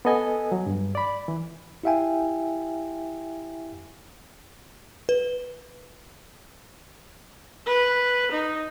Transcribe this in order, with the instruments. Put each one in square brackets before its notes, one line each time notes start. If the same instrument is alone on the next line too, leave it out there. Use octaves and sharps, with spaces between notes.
[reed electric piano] B3 A4 D#5 G#5
F#3
G2
D5 B5
E3
[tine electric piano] E4 G4 E5 F5 G5 G#5
[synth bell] B4
[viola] B4
D#4